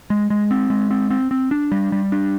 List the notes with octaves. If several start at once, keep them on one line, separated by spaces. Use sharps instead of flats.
G#3
G#3
C4
G#3
C4
C4
C4
D4
G3
G3
D4